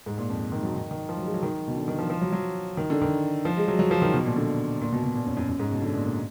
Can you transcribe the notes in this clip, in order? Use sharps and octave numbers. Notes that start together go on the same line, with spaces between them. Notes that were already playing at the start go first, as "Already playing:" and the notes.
G#2
A#2
F2
D#3
F#3
D#3
D#3
F3
F#3
G#3
F#3
D#3
B2
D3
D#3
F3
F3
F#3
F#3
D#3
D3
D#3
F3
G#3
F#3
F#3
F3
D#3
B2
A#2
D3
A#2
B2
B2
A#2
F#2
F#2
F#2
G#2
B2
D3
A#2
A#2